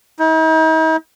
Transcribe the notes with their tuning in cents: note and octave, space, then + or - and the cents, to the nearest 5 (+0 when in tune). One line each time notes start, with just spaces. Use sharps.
D#4 +45